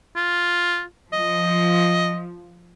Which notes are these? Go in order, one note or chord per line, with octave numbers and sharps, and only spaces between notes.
F4
F3 D#5